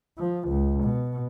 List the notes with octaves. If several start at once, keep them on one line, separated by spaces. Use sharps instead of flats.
F3
C#2
B2